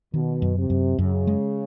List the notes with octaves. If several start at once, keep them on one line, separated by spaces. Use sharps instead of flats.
B2 D#3
F#2
C3
F#2
F#2 C#3
G#3